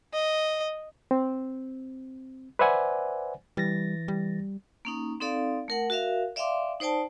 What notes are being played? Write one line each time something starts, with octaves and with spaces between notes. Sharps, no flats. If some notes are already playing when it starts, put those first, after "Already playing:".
D#5
C4
B4 C5 D5 E5 F#5 G#5
E3 G3 A6 A#6
G3
A#3 C#4 D#4
C4 D#4 A4 D5 F5
A3 A#4 F#5
F#4 A#4 E5 F5
D5 E5 F5 G5 C6 D6
D#4 C5 D5 G5 A5